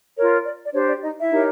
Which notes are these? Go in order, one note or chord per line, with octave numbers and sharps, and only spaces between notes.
F4 A#4 C#5
D5
D5
D4 G4 C5 C#5
D5
D#4 D#5
E4 E5
D#4 G4 A#4 C#5